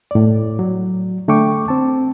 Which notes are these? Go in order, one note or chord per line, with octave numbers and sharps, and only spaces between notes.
A2 D5
F#3
D3 A3 D4 G5 C#6 D6
C4 A5